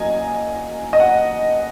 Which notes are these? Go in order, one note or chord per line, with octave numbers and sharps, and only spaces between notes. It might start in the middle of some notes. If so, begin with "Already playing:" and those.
Already playing: F#2 F#3 A#3 D#5 G#5
D#5
F#5